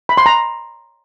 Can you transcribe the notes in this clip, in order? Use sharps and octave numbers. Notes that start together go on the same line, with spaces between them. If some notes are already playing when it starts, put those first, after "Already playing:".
B5
C6
A#5